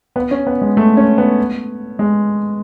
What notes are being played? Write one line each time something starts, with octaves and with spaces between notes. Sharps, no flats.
B3
C#4
B3
G#3
A3
C#4
B3
G#3